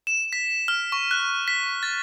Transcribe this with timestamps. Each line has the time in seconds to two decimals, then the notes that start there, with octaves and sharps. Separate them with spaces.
0.07 E7
0.33 B6
0.68 F6
0.92 C#6
1.11 F#6
1.48 B6
1.83 A6